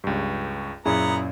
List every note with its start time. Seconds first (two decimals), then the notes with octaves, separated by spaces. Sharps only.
0.04 C#2 G2
0.86 F#2 A#2 B3 E4 G#4 A#5